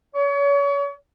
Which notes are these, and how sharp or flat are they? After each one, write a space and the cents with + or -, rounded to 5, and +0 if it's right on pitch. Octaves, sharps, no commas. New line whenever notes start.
C#5 +35